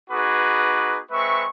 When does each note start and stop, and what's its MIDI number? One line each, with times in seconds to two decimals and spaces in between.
0.10 1.01 59
0.10 1.01 63
0.10 1.01 66
0.10 1.01 68
0.10 1.01 71
0.10 1.01 86
1.11 1.45 56
1.11 1.45 60
1.11 1.45 71
1.11 1.45 76
1.11 1.45 85